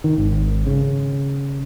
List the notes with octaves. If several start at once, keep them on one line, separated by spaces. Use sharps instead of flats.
D#3
G#1
C#3